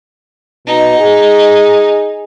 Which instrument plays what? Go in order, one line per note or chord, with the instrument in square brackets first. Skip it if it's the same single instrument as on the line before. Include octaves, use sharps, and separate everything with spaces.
[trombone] B2 [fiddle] D#4
[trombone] G#4